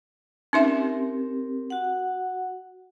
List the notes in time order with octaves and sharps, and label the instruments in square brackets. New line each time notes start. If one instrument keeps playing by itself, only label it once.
[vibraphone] C4 G4 A#4 [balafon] C#4 D#4 E5
[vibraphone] F#4 F#5